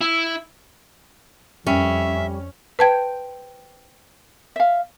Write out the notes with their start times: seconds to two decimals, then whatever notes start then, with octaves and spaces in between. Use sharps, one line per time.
0.01 E4
1.67 F2 G3 C#4 E5
2.79 B4 C5 G5 A5 G#6
4.56 E5 F5